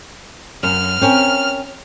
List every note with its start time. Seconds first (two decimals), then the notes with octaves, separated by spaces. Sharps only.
0.63 F#2 F6
1.01 C4 C#4 A#4